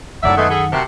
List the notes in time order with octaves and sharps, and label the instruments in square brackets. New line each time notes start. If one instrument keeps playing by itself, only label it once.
[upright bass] F#2 D#3 [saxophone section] A2 D5 E5 [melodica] F#3 [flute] F#5
[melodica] G#3 B3 G#4 [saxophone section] A3
[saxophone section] G#4 A4 [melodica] B5
[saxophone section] C3 [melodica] F#4 A#4 A5